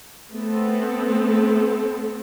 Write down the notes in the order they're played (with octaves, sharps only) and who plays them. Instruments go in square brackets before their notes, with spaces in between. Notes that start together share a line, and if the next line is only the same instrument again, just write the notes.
[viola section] A3 B3 C4 A4